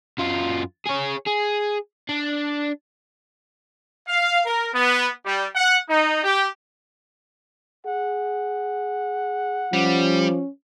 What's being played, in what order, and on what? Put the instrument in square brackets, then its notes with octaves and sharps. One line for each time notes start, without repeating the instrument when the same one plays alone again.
[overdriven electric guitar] F#2 F4
G#4 C#5
G#4
D4
[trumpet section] F5
A#4
B3
G3
F#5
D#4
G4
[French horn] G#4 [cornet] F#5
[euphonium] F3 [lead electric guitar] G3 [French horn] C#4